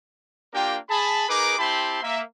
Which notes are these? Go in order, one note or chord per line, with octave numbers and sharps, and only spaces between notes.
A#3 D4 F4 G4 A#4 G5
G#4 A5 B5
D#4 G#4 A#4 B4 D6
C4 E4 G4 A5 B5 C6
A#3 E5